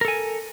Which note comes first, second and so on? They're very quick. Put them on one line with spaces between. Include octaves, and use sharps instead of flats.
A#4 A4 G#5